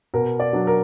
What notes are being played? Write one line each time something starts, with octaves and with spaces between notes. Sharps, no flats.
B2 A#4
D5
F#3 D4
A#4